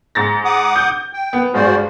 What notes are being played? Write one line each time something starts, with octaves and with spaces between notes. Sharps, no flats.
G#2 A6 A#6
F#5 D6 D#6
G6
G5
B3
G2 G#3 F#4 C5 D5